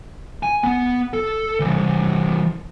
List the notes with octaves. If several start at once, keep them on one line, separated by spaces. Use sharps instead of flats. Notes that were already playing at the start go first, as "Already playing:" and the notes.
G#5
B3
A4
E3 G3